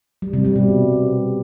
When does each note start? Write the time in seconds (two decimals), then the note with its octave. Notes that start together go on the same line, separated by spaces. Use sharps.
0.22 G3
0.33 C3
0.45 G3
0.56 B2